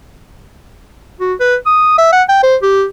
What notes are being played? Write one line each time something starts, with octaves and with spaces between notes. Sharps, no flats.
F#4
B4
D#6
E5
F#5
G5
C5
G4